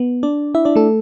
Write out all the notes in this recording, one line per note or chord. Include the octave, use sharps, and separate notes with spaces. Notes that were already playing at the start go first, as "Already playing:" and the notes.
Already playing: B3
D4 D5
E4 E5
D4 D5
A3 A4